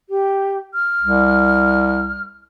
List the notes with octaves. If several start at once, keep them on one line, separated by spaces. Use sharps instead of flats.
G4
F6
C2